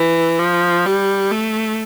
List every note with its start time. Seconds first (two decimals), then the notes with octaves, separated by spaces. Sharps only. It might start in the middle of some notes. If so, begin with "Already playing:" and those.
Already playing: E3
0.39 F3
0.85 G3
1.31 A3